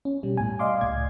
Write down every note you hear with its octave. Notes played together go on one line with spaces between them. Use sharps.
C#4
B2 G3
A2 G#5
D5 D#5 F5 C6 D6
C#2 A2 G#6